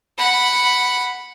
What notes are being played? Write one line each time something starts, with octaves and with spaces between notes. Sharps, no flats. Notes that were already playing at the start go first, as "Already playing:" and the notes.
F#5 B5